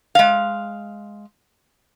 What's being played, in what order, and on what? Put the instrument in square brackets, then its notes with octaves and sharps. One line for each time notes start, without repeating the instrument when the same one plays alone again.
[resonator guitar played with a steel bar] G#3 F5